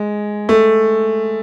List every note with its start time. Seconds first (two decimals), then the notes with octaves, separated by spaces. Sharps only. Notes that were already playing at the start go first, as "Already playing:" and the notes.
Already playing: G#3
0.49 A3